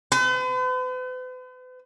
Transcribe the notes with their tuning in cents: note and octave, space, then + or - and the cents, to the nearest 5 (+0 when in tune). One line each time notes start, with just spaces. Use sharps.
B4 +45